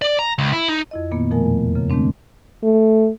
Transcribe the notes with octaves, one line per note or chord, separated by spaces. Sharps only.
D5
A#5
C#2
E4
D#4
F2 E4 D#5
A#2 D#3 A#3 B3
B2 F3 A3 A#4 G#5
E2
F#2 C#3
D#3 G#3 A3 C4 D4
A3